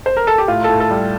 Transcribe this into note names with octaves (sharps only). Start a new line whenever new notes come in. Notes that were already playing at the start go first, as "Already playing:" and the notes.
C5
A#4
A4
G4
A2 F4
A4
A2
A4
G3